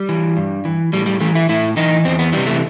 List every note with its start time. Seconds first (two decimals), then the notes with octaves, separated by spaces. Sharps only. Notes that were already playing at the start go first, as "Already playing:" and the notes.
Already playing: G3
0.09 E3
0.37 G2
0.65 E3
0.93 A2 G3
1.06 G3
1.21 E3 A3
1.35 E4
1.49 A2 E4
1.77 E3 D#4
2.05 E2 C4
2.19 B3
2.33 C3 E3 G3
2.47 A3